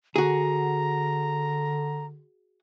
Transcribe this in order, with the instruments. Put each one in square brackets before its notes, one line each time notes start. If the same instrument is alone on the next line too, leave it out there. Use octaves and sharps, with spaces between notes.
[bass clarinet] D3 [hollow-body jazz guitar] F#4 G#4 [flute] A#5